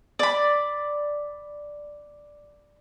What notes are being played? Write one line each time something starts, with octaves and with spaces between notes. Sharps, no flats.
D5 B5